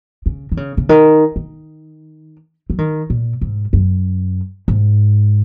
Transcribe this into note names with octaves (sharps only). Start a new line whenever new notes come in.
C#3
D#3
C#3
C#3
D#3
D#3
F#3
D#3
A#2
G#2
F#2
G#2